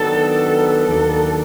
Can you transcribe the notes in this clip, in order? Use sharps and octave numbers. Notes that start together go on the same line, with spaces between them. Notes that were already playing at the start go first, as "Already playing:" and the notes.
Already playing: D#3 F#3 B3 D4 A4
D#2 D#3 F#3 A#3 D4